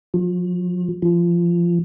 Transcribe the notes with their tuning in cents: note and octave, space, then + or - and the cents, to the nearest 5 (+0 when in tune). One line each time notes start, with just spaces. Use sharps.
F3 +40
F3 -20